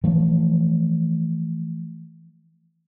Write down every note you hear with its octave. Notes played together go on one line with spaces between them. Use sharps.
E3 F3 A3